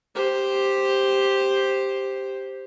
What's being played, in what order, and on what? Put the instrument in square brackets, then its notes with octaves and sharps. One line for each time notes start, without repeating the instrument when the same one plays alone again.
[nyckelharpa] G4 C5